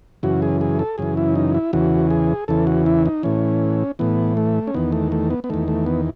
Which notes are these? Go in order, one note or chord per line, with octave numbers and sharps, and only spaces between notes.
F#2 C#3 E3 F#4
G#4
G#4
A4
F#2 C#3 E3 G#4
E4
D#4
E4
E2 C#3 E3 F#4
G#4
E2 C#3 E3 A4
F#4
E4
D#4
A2 E3 C#4
A2 E3 B3
A3
C#4
E2 D#3 B3
A3
A3
B3
B3
E2 D#3 A3
A3
B3